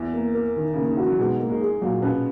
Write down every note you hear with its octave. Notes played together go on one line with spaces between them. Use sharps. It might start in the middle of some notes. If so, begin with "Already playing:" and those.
Already playing: E2 E3
A#3
A#4
D#3
C#3 A#3
D#3
E3 F#4
F#3
G#2 B2 G#3
A#3
G#2 G#3
G#4
A#2 F#3 A#3
B2 B3 C#4